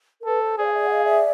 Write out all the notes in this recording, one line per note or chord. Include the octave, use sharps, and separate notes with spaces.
A#4
A4 B4
C5
G#4 C5 D5
F5
D5 E5
F#5
D#5 F5
D5 E5